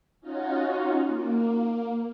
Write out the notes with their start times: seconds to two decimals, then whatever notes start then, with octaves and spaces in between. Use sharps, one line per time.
0.21 C#4 D#4 F4 F#4
1.07 A#3